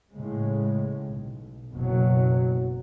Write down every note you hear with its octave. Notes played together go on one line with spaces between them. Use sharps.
A2 C#3 G#3
B1
F#1 B2 F#3